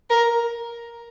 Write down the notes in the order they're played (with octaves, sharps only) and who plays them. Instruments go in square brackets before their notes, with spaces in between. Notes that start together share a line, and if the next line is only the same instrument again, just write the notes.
[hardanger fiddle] A#4